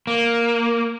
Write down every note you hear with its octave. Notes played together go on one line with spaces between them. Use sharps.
A#3